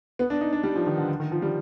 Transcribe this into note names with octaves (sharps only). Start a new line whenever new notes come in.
B3
D4
D#4
D4
G3
F3
D#3
D3
D3
D#3
F3
G3